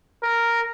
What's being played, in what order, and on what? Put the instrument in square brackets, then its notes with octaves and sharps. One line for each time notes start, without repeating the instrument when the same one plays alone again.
[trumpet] A#4